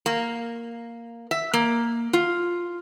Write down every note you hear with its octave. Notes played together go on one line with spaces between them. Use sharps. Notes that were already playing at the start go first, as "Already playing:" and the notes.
A#3
E5
A#3
F4